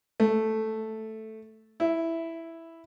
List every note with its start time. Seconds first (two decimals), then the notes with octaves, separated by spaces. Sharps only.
0.20 A3
1.80 E4